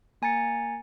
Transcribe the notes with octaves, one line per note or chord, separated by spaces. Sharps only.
A#3 G#5 A#5 A6 C#7